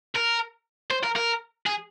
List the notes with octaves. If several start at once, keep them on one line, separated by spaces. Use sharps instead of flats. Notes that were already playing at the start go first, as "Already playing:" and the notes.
A#4
C5
A#4
A#4
G#4